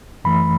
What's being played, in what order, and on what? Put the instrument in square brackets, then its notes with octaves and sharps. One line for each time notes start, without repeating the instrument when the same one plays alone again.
[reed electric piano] F#2 E3 A3 B5